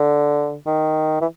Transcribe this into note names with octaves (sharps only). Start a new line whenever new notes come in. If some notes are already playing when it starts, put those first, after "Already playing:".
Already playing: D3
D#3
E3